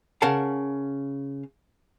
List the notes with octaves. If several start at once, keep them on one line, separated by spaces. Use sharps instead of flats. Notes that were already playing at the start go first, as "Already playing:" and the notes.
C#3 A#4 F5 F#5 A5